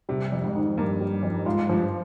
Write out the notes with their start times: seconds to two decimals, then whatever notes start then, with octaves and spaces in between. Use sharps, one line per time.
0.09 C3 G3
0.32 F2
0.43 G#2
0.55 D#3
0.78 G2 A#3
1.01 G3
1.23 F2
1.45 G#2 F4
1.69 G2 F3